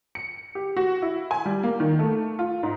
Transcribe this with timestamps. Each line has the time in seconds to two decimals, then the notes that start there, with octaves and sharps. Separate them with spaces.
0.15 C#7
0.55 G4
0.77 F#4
1.02 E4
1.31 G#5
1.46 G3
1.63 A#3
1.80 D#3
1.99 A3
2.39 F4
2.63 G#2